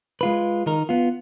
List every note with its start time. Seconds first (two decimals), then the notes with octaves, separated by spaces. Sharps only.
0.21 G#3 F4 B4
0.66 D#3 D#4 A#4
0.89 B3 F4